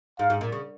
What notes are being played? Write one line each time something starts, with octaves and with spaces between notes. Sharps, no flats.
G#2 F5
G#2
A#2
C#3